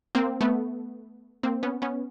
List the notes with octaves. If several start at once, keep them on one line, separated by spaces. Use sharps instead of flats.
A#3 C4
A3 B3
A#3 C4
B3 C#4
B3 C#4